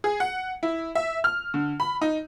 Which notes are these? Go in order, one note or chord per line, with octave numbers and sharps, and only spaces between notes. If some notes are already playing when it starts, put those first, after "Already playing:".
G#4
F#5
E4
E5
F6
D3
B5
D#4